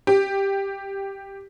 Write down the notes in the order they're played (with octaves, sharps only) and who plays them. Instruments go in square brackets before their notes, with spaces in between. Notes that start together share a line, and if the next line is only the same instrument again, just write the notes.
[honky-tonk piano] G4